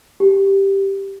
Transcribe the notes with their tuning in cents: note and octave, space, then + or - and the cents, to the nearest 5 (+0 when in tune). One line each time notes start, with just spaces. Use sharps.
G4 +0